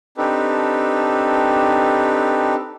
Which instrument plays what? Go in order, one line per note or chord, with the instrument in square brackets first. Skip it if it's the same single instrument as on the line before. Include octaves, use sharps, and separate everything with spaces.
[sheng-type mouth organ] C4 D4 D#4 G4 A4 B4